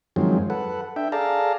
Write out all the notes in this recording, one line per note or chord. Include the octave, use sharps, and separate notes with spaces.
F#2 D#3 F3 F#3 G#3 C4
A4 B4 F#5
D4 E5 G5
G#4 A4 D5 F5 A5 A#5